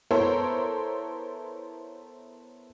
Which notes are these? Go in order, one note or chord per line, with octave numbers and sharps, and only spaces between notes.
B3 E4 A4 A#4 C5 C#5